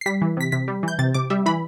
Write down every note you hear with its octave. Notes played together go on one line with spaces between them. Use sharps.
C7
G3 B6
E3
C3 B6
C3 B6
G3
E3 G6
C3 A6
C3 D6
G3 E5
E3 B5